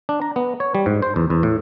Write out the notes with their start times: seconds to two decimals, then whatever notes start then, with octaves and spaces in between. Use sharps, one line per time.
0.09 D4
0.22 A#5
0.36 B3
0.60 C#5
0.75 G3
0.86 G#2
1.02 C5
1.16 E2
1.30 E2
1.43 A2